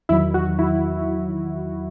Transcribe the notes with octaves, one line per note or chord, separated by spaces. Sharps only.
E2 D#3 F#3 E4
F#4
E4